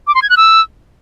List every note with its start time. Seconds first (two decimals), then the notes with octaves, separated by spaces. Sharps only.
0.07 D6
0.15 C6
0.22 G#6
0.29 F#6
0.37 E6